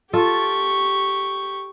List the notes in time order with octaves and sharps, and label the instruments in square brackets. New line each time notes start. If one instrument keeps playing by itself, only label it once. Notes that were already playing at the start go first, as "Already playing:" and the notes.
[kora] F4 A4 [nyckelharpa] G4 C#6